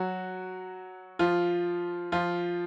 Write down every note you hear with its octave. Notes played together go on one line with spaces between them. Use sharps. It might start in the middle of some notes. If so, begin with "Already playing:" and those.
Already playing: F#3 F#4
F3 F4
F3 F4